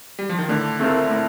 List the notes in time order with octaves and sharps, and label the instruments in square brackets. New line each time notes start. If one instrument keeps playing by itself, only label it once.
[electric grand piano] G3
F3
D#3
[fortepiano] A2 [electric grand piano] D3
[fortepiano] A3 C4 F4 A#4
A2